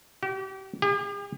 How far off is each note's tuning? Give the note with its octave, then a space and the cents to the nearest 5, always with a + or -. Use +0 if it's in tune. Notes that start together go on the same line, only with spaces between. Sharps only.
G4 -35
G4 +45